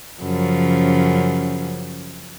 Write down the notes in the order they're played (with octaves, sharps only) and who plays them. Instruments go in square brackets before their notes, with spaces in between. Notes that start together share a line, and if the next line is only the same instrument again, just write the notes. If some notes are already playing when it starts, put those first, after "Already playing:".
[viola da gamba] F#2 C#3 F3